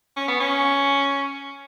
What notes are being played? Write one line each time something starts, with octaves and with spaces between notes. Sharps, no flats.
C#4
B3
C#4